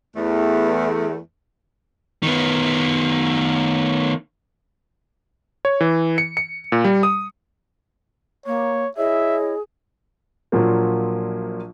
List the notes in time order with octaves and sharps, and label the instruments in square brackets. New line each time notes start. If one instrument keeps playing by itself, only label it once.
[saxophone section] E2 A3
[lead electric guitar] D#3 B3
[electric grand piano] C#5
E3
C#7
C#7
A#2
G3
D#6
[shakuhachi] A#3 [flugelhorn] C#5
[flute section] E4 C#5 D#5 [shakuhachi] G#4 [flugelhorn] E5
[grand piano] A#1 A#2 F3 F#3 A#3